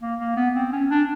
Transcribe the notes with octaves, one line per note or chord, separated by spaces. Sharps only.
A#3
A#3
B3
C4
C#4
D4